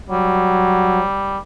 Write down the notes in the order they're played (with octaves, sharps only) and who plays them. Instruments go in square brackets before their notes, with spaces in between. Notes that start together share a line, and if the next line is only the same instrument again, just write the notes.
[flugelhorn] F#3 [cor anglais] G3